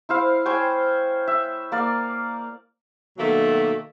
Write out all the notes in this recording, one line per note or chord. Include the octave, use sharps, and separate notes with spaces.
E4 C5 F5
C5 C#5 G5 G#5
E5
A#3 D5 F5
B2 D#3 F#3 A3 A#3